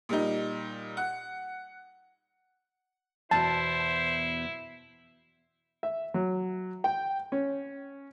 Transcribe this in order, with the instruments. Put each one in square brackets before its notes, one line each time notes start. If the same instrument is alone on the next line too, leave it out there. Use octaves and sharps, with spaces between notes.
[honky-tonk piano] A#2 G3 D#4
F#5
[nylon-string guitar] E2 B2 [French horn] E4 [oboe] C5 [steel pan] A5
[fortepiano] E5
F#3
G5
C#4